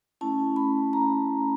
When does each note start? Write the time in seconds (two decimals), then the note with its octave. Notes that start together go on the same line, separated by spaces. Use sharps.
0.21 A3 C#4 E4 A5
0.56 B5
0.93 A#5